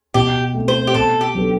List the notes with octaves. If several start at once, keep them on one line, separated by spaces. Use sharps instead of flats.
B2 G4
A3 C4
C5
G4
B2 A4
G4
F#3 B3 D4 A4